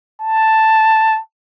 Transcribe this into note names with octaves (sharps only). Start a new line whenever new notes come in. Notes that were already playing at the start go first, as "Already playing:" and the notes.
A5